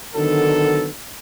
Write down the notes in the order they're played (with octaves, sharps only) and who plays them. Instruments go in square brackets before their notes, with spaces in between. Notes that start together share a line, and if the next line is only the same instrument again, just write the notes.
[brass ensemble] D3 D#3 F#3 B3 D#4 A4